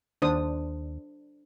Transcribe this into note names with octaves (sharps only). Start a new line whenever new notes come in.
D#2 D4 C5 D#6